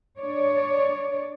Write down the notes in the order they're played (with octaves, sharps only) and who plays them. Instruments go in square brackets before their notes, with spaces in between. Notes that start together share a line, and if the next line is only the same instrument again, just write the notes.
[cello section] D4 C#5 D5